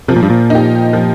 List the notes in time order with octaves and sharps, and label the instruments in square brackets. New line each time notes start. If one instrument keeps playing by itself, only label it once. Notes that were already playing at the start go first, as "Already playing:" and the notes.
[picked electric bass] C3 [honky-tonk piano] F3
[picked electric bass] A#2
G2
A#2
[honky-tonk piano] D#4 G4
F3